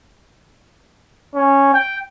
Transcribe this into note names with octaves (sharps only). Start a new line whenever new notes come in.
C#4
G5